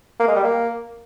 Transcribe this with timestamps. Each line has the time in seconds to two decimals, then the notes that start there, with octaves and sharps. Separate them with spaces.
0.20 A#3
0.27 G#3
0.35 G3
0.43 A#3